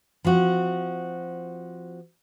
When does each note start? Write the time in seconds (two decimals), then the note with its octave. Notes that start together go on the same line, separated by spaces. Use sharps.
0.25 F3 C4 F#4